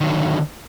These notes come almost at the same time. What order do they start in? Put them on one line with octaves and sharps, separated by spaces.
D#3 F#3 D3